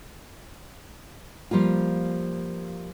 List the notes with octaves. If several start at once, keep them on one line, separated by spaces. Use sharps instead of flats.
F3 G3 A#3 F4